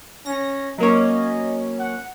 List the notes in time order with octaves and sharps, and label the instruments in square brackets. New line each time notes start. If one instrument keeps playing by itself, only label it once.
[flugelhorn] C#4 [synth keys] A#6
[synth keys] F#3 A#3 C#4 [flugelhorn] D#5
[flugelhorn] F#5